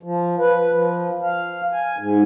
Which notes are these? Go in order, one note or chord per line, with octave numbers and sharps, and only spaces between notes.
F3
B4
F3
F5
G#5
G#2